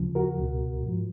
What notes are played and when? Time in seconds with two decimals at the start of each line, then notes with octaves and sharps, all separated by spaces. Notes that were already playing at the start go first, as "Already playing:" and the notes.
Already playing: D#2 C#3 F3
0.15 F#4 A#4
0.39 C#2 B2
0.83 G#2 F3